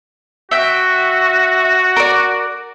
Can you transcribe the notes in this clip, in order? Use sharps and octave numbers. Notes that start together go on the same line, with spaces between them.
F#4 E5 G5
A#4 D5